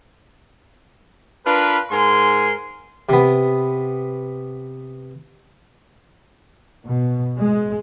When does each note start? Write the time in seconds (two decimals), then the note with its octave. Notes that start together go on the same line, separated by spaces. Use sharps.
1.46 D4 F4 A#4 B4
1.91 G#2 A#4 G#5 C6
3.09 C3 B3
6.86 B2
7.38 G#3